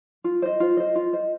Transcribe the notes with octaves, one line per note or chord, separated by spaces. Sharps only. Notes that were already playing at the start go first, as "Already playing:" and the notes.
F4
C5 D#5
F4
C5 D#5
F4
C5 D#5